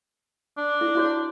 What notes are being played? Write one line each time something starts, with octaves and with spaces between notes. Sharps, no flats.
D4
E4
E4 F#4 C#5